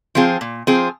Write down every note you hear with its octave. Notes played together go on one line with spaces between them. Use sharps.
F3 C4 F4 G#4
A#2
F3 C4 F4 G#4